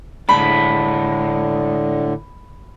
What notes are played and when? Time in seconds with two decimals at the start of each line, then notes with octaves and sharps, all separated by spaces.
0.29 A2 D3 G#3 A3 D4 B5